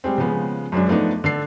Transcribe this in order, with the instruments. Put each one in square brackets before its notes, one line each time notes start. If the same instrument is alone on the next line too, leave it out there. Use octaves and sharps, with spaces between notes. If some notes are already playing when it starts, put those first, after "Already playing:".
[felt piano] G3 G#3 C4
C#3 F3 G#3 B3
F#2 F#3 G#3 D4
F3 A3 B3 D4 D#4
D3 A4 C7